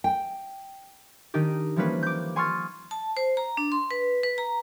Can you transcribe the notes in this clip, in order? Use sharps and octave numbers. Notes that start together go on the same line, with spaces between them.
G5
D#3 D4 D#4 G4
E3 F3 G3 A#3 C#4 B4
D6 G6
G#5 C6 C#6 D#6 F6 A6
A5
C5
A#5
D4
C6
B4
B4
A#5